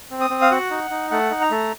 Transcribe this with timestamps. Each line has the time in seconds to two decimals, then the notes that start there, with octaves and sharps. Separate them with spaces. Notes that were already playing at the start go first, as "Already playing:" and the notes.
0.11 C4
0.21 D#6
0.30 C4
0.42 F5
0.51 F#4 F#5
0.71 D#4
0.91 D#4
1.11 A3 F#5
1.31 D#4
1.41 A#5
1.51 A3